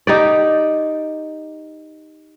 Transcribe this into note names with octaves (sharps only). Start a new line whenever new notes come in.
D#4 G4 D5